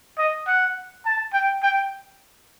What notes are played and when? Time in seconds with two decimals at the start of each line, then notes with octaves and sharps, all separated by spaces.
0.18 D#5
0.47 F#5
1.06 A5
1.33 G5
1.63 G5